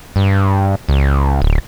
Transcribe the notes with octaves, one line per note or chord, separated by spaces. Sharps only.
G2
C#2
D1